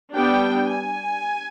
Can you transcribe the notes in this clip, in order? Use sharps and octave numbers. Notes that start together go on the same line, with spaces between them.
G3 B3 D4 G5
G#5